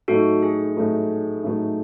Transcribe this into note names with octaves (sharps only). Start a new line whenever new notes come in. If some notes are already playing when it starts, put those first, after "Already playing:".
A2 F#3 A3 D#4 F#4 A4
G#4
A2 F#3 A3 D#4
A2 F#3 A3 D#4